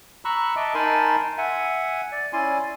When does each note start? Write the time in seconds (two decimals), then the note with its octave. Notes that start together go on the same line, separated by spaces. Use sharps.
0.25 A#5 B5 C#6 E6 F#6
0.56 D#5 E5 A5 D6
0.74 D#4 A#4 G#5 A5 B5 C6
1.38 E5 F#5 G#5
2.12 D5
2.33 C#4 E4 D5 G#5 C6